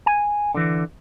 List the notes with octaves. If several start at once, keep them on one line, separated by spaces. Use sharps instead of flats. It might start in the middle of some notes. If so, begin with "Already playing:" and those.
G#5
D3 E3